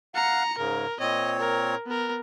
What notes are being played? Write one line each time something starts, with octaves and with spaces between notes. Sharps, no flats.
F5 F#5 A#5 C#7
G#2 C#3 A#4
A#2 C4 C#5 D#5
A#4
B3 A#4